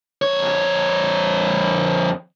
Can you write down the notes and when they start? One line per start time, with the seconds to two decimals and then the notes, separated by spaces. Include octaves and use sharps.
0.22 F2 C#5